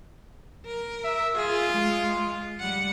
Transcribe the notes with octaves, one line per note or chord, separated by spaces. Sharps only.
A#4
E5
F4 G#4
G#3
G3 F#5